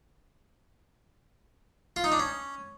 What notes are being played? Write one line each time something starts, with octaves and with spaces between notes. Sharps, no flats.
F4
D#4
D4
C#4